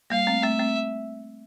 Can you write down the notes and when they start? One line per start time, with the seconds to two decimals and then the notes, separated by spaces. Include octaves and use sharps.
0.10 G3 A#3 F5
0.27 A3 C4
0.42 A3 C4 E5
0.59 A3 C4